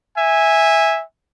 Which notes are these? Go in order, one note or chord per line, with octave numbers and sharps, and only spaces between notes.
E5 G#5